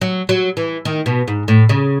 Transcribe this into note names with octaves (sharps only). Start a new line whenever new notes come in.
F#3
F#3
E3
D#3
B2
G#2
A2
C#3